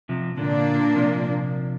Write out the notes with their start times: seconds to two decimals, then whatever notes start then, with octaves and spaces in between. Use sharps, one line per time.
0.09 C3 F3
0.37 A#2 D3 A#3 D4
0.95 C3 F3